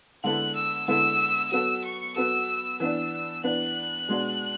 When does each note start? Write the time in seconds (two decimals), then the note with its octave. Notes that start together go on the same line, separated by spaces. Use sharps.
0.24 D3 G#3 B3 E4 A4 F#6
0.56 E6
0.88 D3 G#3 B3 E4 A4 E6
1.52 F#3 B3 F#4 A4 E6
1.84 C#6
2.16 F#3 B3 F#4 A4 E6
2.80 E3 B3 D4 E6
3.44 E3 B3 D4 F#6
4.08 B2 G#3 D4 F#4